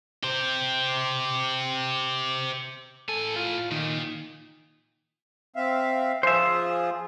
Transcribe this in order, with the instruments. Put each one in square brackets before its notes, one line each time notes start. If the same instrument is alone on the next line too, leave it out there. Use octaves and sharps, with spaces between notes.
[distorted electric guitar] G4 C5
[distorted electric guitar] A2 G#5 [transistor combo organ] A4
[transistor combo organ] F4
[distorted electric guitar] A#2 [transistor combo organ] D#3
[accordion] C4 E5 F5
[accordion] F3 F4 G#4 [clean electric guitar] C5 E5